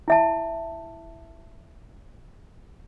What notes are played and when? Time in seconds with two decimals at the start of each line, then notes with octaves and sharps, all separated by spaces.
0.08 E4 E5 A5